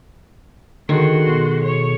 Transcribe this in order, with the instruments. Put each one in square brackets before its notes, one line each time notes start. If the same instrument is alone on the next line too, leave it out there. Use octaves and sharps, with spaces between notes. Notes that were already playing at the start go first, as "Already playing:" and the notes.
[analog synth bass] D3 [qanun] D#3 [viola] F#4 C6 [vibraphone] G#4 A4
[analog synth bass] B2
[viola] C#5